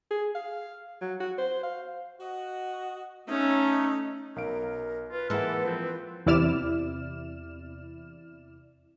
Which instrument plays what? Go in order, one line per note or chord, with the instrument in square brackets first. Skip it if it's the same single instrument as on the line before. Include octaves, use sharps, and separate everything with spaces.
[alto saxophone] G#4
F5
F#3
F#4
C5
F5
[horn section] F#4 D#5
[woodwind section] A3 [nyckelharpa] C#4 [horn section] D#4
[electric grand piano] B1 F5 D7 [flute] A#4
[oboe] F4 [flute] B4
[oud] E3 A#3 [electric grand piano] G#3 E4 F#5 [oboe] A4
[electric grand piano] F3 [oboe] C4
[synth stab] E2 C3 E4 D5 F6 E7